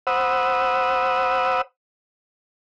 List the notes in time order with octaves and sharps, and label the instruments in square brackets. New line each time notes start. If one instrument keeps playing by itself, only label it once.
[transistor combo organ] C5 F#5 B5 D#6 E6